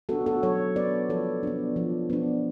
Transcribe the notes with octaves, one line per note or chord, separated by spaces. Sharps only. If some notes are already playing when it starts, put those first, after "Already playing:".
B3 D4 F#4 A4
F#4 A4
F#3 A4 C#5
B3 D4 B4 D5
F3 A4 C#5
B3 D4
F3
B3 D4